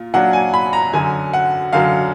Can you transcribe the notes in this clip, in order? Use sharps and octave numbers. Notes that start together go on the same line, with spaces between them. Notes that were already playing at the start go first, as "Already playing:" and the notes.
Already playing: A#2 F4
A#2 F#3 D4 F4 F#5
G#5
B5
A#5
F#2 D3 F#3 G#5
F#5
F#2 D3 F#3 F5